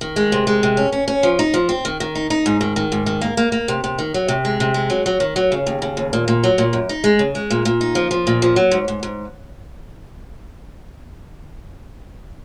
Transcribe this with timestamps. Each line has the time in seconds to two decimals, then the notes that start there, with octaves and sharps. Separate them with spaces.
0.01 D#3
0.16 G#3
0.32 C3
0.47 G#3
0.63 C3
0.77 C#4
0.92 C#4
1.08 C#4
1.23 F3
1.39 D#4
1.54 F3
1.69 C4
1.85 D#3
2.00 D#3
2.15 D#4
2.30 D#4
2.46 G#2
2.61 D#3
2.76 D#3
2.92 G#2
3.06 D#3
3.22 A#3
3.37 A#3
3.52 A#3
3.68 C3
3.84 C3
3.99 D#3
4.14 F#3
4.28 C3
4.45 G#3
4.60 C3
4.74 G#3
4.90 F#3
5.06 F#3
5.20 D#3
5.36 F#3
5.52 C#3
5.67 D#2
5.82 C#3
5.97 D#2
6.13 A#2
6.28 A#2
6.44 F#3
6.58 A#2
6.73 F#2
6.89 D#4
7.04 G#3
7.19 C#3
7.35 G#3
7.50 A#2
7.65 A#2
7.81 D#4
7.95 F3
8.11 F3
8.27 A#2
8.42 F3
8.56 F#3
8.71 G#2
8.88 G#2
9.03 G#2